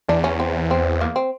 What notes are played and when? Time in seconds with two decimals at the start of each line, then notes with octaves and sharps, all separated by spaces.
0.09 E2 D4
0.24 C#4
0.40 C4
0.71 C4
1.01 A#3
1.16 C4